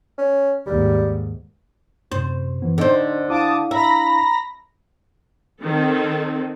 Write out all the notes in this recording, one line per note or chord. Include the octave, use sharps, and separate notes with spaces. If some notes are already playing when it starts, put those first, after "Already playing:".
C#4
D#2 G#2 G3
F#2 C3 C5
F#2 E3 B3
D3 D4 D#4 C5 D#5
D4 E4 F5 A5 D6 D#6
E5 A#5 B5 A#6
D#3 C4 A4